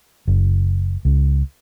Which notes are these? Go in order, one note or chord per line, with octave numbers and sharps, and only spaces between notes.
F#1
C#2